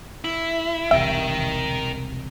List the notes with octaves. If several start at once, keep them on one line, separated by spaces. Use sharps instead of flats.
E4
E1 C2 C3 A#4 E5 G5